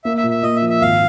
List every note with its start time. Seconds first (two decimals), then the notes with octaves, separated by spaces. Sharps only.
0.05 A#3 E5
0.17 E5
0.23 A#2
0.30 E5
0.43 A#2 D#5
0.56 E5
0.62 F3
0.69 E5
0.81 G#1 F5